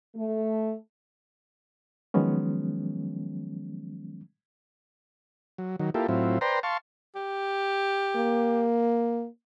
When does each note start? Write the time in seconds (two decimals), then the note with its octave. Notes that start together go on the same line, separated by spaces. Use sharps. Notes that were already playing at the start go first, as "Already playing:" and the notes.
0.16 A3
2.14 D#3 F3 F#3 G#3 B3 C#4
5.58 F#3
5.79 D#3 F#3
5.94 A#3 E4 F4 G4 A4
6.08 A2 F#3 C4 E4 F4
6.41 B4 C5 D5 G5 A#5 C6
6.63 F5 A5 C6 C#6
7.15 G4
8.16 A#3